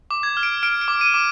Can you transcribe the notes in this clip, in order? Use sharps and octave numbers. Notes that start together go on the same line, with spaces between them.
D6
G#6
F6
D7
F6 D7
D7
D6
D#7
D6